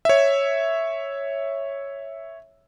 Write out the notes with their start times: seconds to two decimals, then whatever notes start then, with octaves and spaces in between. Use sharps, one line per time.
0.05 C#5 E5